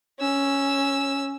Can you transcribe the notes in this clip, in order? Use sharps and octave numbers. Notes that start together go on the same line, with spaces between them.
C#4 E6